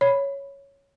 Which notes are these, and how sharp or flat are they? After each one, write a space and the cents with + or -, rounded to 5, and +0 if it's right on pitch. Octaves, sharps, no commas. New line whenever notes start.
C#5 +0 B5 +0